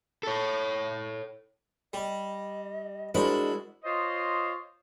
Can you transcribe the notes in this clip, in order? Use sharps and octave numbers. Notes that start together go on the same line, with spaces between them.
A4 C#5
G3 D#5
G#3 D4 E4 F#4 A#4 C5 D5
F4 C5 C#5 D#5